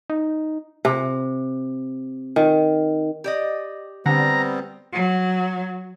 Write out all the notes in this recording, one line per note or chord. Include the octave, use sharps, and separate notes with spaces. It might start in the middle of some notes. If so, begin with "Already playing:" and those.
D#4
C3
D#3
G4 D5 D#5
D3 G3 B3 C4 A#5
F#3